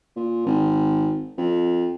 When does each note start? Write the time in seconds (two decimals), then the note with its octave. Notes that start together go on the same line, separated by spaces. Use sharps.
0.16 A#2
0.46 G#1
1.38 F2